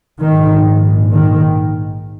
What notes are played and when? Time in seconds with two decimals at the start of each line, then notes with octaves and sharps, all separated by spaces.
0.21 A#1 G#2 D#3
1.11 D#3